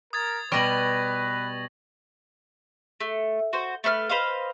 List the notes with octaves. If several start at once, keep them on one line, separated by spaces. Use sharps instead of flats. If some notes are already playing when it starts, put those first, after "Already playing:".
A#4 D#6 G#6 A6
B2 G3 B4 C#6 A#6 F#7
A3
F#4 C5
A3 B4 E5 F6
B4 C5 D#5 F5